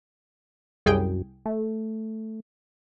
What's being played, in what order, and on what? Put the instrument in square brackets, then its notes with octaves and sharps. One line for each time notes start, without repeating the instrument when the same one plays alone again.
[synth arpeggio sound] C2 G#4 G5 [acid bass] F#2
[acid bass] A3